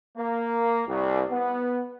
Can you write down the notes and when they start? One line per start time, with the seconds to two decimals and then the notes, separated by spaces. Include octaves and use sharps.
0.17 A#3
0.88 C2
1.31 B3